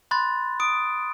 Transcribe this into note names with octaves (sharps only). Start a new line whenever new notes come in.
B5 C6 F#6 A6
D#6 D7